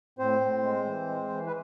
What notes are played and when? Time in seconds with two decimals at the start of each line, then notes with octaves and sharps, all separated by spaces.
0.19 A2 C4 C5
0.41 A2
0.63 G#3
0.86 E3
1.08 G#3
1.30 E3
1.47 B4